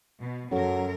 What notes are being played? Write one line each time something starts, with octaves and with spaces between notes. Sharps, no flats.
B2
F#2 F#3 C#4 A4 A#4